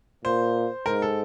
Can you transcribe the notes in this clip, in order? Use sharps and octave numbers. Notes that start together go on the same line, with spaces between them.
A#2 C5
G#2 A#4
A4